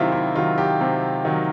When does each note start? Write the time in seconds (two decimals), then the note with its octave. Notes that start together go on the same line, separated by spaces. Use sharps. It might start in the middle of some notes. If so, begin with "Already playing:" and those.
Already playing: C3 D#3 F#3 E4 F4 G4
0.12 E4
0.35 D#3 F#3 F4
0.58 G4
0.81 C3
1.25 D#3 F#3